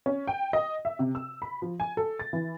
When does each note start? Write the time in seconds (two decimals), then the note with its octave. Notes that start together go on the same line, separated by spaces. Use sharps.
0.06 C#4
0.27 G5
0.53 D#5
0.85 E5
0.99 C3
1.15 E6
1.42 B5
1.62 F3
1.80 G#5
1.97 A4
2.19 A6
2.33 E3